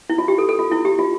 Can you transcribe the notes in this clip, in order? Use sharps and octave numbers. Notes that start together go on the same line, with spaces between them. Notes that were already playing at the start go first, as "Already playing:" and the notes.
E4
F4
G4
A4
A4
F4
E4
G4
F4